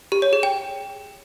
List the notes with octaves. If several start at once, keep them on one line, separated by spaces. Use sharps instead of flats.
G4
C#5
G#4
G5